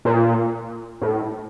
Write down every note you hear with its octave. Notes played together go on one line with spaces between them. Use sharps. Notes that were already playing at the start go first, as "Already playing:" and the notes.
A#2
A2